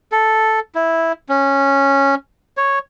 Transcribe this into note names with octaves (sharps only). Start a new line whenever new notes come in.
A4
E4
C#4
C#5